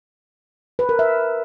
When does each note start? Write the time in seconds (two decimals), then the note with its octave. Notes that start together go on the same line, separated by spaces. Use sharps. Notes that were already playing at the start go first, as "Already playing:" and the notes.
0.79 B4
0.89 A#4
0.99 E5